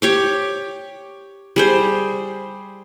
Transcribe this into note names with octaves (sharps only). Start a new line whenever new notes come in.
G4 C#5 D6
G3 G#4 C5